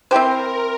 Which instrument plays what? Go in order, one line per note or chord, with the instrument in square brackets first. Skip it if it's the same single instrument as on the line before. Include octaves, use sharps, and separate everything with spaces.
[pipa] C4 E4 G4 C5 [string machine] A#4